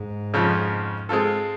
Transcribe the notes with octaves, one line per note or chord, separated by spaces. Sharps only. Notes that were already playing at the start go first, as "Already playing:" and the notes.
Already playing: G#2
F2 C#3 F3
G#3 C4 F4 A4